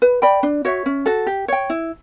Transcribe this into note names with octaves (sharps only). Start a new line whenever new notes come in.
B4
D5 G5 B5
D4
F#4 C#5 E5
C#4
F#4 A4
G4
C#5 G5
E4